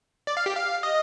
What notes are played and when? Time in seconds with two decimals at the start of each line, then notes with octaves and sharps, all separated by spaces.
0.27 D5
0.37 F5
0.46 G4
0.55 F5
0.83 D#5